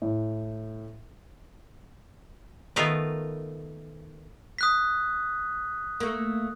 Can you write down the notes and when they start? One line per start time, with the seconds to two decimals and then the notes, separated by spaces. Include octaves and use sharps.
0.02 A2
2.76 D#3 A3 B3 F4 A#4 B4
4.58 D#6 F#6 B6
6.00 A3 A#3